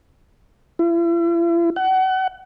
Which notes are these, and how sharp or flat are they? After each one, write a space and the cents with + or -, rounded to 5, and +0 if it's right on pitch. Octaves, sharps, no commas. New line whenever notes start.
E4 +45
F#5 +30